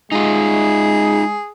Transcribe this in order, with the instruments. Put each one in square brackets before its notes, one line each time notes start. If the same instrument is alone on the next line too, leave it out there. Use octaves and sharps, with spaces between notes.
[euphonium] G#3 [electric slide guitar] D#4 F4 [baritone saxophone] G#4